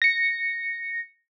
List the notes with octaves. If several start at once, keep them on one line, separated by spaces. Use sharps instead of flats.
A#6 C#7